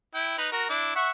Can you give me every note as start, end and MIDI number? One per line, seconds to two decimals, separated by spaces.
0.15 0.38 64
0.15 0.38 79
0.38 0.47 63
0.38 0.47 71
0.38 0.47 83
0.52 0.67 66
0.52 0.67 70
0.70 0.95 62
0.70 0.95 64
0.96 1.10 76
0.96 1.10 78
0.96 1.10 85